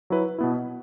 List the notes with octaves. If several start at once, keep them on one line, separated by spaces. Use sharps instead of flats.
F#3 E4 B4
B2 B3 E4